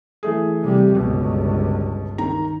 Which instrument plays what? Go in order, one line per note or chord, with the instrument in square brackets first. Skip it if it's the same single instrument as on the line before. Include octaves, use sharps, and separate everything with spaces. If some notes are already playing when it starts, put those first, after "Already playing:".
[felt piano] E3 A3 G#4
[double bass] C3 G3
[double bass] G1 C#2 [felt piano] B2
[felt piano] D#3 A#5